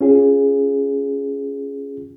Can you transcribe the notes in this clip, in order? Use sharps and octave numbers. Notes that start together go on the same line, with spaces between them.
C#4 F4 G#4